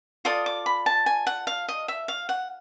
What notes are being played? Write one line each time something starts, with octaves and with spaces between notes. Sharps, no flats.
F4 A4 D5 D#6
D6
B5
A5
G#5
F#5
F5
D#5
E5
F5
F#5